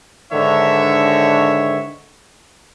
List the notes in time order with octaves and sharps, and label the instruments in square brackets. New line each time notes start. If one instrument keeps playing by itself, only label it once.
[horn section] G#2 D3 D#3 D4 C#5 E5